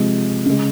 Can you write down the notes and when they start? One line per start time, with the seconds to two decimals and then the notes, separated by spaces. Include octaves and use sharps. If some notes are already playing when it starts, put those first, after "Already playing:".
Already playing: C3 F3 G#3
0.46 C#3 G#3